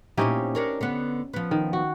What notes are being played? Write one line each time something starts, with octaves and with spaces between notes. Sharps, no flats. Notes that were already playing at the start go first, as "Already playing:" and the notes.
A#2 C4 C#4 D#4 E4 G4
D4 A#4 C#5
D3 B3
F3 B3
D#3
F#4